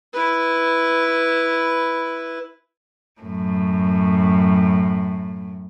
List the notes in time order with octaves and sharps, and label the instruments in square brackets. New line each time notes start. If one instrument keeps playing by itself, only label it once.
[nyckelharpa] E4 B4
[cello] F#2 A2